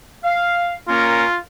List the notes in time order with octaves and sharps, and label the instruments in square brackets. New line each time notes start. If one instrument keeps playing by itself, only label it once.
[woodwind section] F5
[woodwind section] A#3 C#4 A#4 [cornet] F4